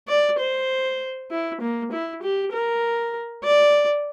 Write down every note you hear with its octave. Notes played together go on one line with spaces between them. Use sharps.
D5
C5
E4
A#3
E4
G4
A#4
D5